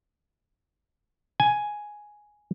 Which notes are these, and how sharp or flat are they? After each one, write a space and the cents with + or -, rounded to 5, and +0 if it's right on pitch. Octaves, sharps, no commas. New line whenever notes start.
G#5 +5